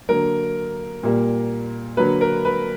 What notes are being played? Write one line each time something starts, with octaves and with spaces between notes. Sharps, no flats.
D3 F#3 A#3 A#4
A#2 G3 A#3
D3 F#3 A#3 B4
A#4
B4